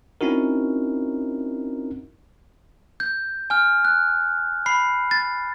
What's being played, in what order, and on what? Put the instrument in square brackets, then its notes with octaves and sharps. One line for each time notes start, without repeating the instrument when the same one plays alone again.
[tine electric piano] C4 C#4 D#4 E4 F#4 A#4
[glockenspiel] G6
G#5 F6
F#6
B5 C7
A6